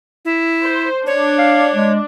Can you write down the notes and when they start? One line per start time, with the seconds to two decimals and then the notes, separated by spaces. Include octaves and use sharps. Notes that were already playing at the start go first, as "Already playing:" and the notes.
0.25 E4
0.62 C5
1.07 D4 C#5
1.38 F5
1.73 G#3